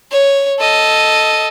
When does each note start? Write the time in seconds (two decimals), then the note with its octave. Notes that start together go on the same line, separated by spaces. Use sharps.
0.12 C#5
0.59 A4 D#5